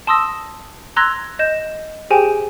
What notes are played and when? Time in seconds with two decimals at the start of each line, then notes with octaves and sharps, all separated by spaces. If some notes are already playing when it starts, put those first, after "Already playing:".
0.07 A5 C6 D#6 E6 A#6
0.96 A#5 C6 E6 F#6 G#6 A#6
1.39 D#5 G6 E7
2.10 G4 G#4 C5 G5 G#5